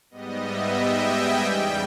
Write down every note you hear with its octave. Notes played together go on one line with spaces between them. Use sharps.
G#2 G3 B3 D#5
E5
G5
G#5
E2 C#3 G3 G5